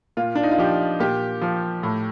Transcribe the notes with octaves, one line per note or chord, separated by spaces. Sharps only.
A#2 F4
D4
D#4
F4
F3 G4
A#2 G4
F3
A2